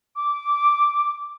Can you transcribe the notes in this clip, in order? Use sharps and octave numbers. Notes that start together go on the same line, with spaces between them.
D6